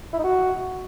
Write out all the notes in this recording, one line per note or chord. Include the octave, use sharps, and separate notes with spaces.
E4
D#4
F#4